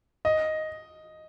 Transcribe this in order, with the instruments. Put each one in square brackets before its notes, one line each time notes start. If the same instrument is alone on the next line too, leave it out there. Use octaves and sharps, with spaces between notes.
[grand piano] D#5